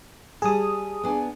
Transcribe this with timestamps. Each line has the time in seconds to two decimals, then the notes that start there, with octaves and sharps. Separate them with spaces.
0.42 G3 G#4 A5 D#6
1.03 B3 D4 G#5